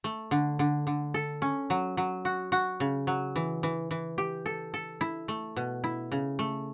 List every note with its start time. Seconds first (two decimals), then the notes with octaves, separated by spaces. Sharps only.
0.04 A3
0.31 D3
0.59 D3
0.87 D3
1.14 A4
1.42 C#4
1.70 F#3
1.97 F#3
2.25 F#4
2.52 F#4
2.80 C#3
3.07 F#3
3.36 E3
3.63 E3
3.91 E3
4.18 G4
4.46 A4
4.74 A4
5.01 E4
5.28 A3
5.56 B2
5.84 E4
6.12 C#3
6.39 A3